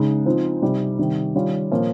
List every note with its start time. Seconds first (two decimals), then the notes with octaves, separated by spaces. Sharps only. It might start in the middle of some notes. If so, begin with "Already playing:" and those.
Already playing: C#3 G#3 D#4
0.26 F3 C4 D#4
0.62 C3 G3 C4 D#4
0.99 C3 D#3 G3
1.35 D#3 G3 C#4 F4
1.72 A#2 F3 A#3 C#4